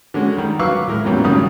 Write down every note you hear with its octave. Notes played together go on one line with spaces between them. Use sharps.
D3 G#3 C#4 F#4
D#3 G3
F#3 B4 F5 C#6 D6 E6
A2 G#3 A#4
E2 A#2 C#3 F#3 G3 C#4
G#1 C#3 F#3 G3 D#6